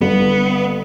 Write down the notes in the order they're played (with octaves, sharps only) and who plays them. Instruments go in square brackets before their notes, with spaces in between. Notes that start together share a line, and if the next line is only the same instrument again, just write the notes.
[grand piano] G1 [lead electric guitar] B3